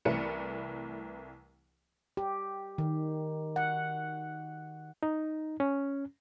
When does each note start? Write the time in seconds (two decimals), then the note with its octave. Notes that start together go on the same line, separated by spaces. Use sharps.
0.05 C2 E3 A3 A#4 B4 C#7
2.17 G4
2.78 D#3
3.56 F#5
5.03 D#4
5.60 C#4